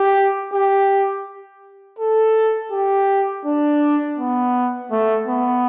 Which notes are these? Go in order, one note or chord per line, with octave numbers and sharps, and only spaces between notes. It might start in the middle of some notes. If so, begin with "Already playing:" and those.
Already playing: G4
G4
A4
G4
D4
B3
A3
B3